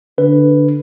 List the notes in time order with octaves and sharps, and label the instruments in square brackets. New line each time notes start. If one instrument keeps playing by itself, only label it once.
[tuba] D3 [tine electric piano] B4